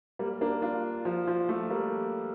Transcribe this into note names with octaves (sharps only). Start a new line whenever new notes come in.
G3 A#3
A#3 D4
D4 F4
F3
F3
F3 A3
G3 A#3